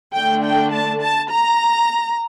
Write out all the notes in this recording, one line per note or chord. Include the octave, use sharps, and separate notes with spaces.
D3 A3 D4 G5
G5
A5
A5
A#5